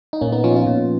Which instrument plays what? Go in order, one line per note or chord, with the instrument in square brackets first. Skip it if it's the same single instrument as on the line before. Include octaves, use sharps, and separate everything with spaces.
[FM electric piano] D#4
A#2 A#3 C#4
B3 D#4
F3 C#4 F4
D#4
C#4 F4
A#2